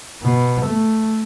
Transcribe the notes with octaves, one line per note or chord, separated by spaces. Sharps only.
B2
A3